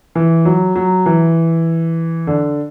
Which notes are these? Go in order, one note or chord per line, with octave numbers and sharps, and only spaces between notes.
E3
F#3
F#3
E3
D3